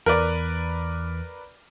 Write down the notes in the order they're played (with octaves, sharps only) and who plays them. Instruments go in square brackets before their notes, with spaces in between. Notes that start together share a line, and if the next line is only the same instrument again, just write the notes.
[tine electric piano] E2 E3 [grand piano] A#4 B4 D5